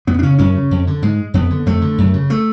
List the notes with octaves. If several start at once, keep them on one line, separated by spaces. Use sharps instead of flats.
F2 B3
D4
C#3 C#4
F#2 C#4
C#3
F2
D3
G#2 G#3
F2 B3
D3
F2 A3
D3
F#2
C#3
A3